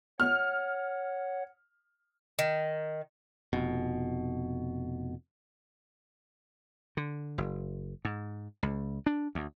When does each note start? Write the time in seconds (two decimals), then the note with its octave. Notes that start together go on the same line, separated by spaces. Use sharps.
0.20 C#5 F#5 F6
2.39 D#3
3.53 F1 B2
6.97 D3
7.38 F#1
8.05 G#2
8.63 C#2
9.06 D4
9.35 D2